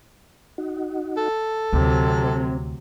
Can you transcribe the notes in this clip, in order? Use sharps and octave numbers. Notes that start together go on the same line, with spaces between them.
D#4 F#4
A4
D2 C3 F#3 C4